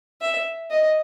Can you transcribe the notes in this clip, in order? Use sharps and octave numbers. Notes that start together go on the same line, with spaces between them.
E5
D#5